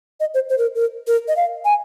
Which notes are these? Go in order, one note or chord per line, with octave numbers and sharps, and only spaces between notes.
D#5
C5
C5
A#4
A#4
A#4
D#5
F5
G#5